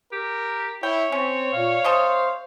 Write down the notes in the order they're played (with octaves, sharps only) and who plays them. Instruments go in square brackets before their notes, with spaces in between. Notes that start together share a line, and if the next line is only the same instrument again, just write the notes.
[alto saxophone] G4 [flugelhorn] A#4
[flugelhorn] E4 [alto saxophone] C#5 [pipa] G5
[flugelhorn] C4 [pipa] C#4
[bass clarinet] A#2 [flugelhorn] F5
[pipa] C3 D#5 A5 [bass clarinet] C5